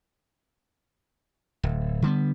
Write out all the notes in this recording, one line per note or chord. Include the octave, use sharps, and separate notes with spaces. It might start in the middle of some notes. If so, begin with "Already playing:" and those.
D1
D3 G3 B3